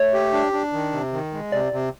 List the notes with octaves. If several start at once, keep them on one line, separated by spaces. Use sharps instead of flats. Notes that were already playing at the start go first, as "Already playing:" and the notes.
Already playing: A3 C#5
G4
D4
D4
D#3
C3
D#3
G#3
C3 D5
C3